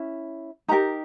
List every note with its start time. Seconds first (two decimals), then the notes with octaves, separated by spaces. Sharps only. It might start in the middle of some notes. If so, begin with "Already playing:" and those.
Already playing: C#4 E4
0.68 D#4 G4 A#4 A#5